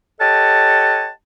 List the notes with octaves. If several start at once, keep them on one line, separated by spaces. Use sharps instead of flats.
G4 A4 C#5 D#5 F#5 A5